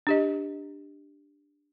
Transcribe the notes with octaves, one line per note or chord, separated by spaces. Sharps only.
D4 G4 D#5